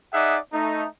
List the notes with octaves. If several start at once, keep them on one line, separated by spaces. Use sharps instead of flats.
D#4 G#4 D5 E5 F#5
A3 D#4